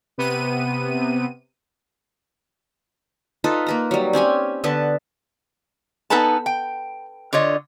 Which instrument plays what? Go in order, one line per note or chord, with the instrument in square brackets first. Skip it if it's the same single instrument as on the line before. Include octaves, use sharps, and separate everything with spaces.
[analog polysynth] C3 B3 D#7
[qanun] D#4 F4 A4 B4
A#3 B4 A#5
F#3 G3
C4 C#4 G4 G#5
D3 B3 B4 A5
[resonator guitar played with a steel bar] B3 D#4 A4 B4 G#5 A5
G5
D3 F4 C#5 D#5